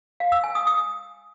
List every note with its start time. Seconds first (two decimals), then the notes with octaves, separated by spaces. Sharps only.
0.20 F5
0.32 E6
0.44 G#5
0.55 D#6
0.67 D#6